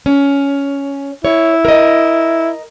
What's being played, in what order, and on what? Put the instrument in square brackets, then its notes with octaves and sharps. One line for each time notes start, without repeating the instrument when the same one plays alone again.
[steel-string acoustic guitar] C#4
[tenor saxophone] E4 [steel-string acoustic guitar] C#5
[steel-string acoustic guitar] A#4 D#5